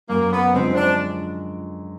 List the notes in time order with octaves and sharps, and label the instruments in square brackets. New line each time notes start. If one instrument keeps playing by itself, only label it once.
[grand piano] F#2 [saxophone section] A#3
[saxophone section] B3
[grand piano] D3 F3 G#3 [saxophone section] C4
[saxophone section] D4